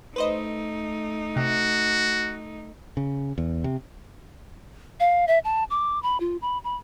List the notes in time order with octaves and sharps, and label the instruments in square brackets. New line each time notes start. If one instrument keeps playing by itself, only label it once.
[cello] A3 D#4 [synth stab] B4 C5 D#5
[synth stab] C3 [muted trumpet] F#4
[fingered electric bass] C#3
E2
C3
[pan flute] F5
E5
A5
D6
B5
F4
B5
B5